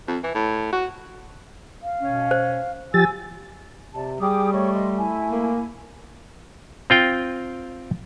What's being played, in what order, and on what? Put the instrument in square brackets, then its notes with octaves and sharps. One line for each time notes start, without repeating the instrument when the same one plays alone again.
[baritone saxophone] F2
E3
A2
F#4
[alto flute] F5
[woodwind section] B2 C#4
[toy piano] C5
[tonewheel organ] F3 G4 A6 [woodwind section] G#5 E6
[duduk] C3 [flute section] D5 A5
[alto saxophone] G3 [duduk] G#4 [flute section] G5 D6 D#6
[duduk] A3 [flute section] C#5 D#5 C#6
[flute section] D#5 C6
E4 G#5
[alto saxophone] A#3
[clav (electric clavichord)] C4 F4 G5